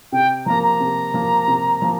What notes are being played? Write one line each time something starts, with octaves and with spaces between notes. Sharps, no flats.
C3 G5
F3 A#3 A#5
A#5
C3
F3 A#3
C3
F3 A#3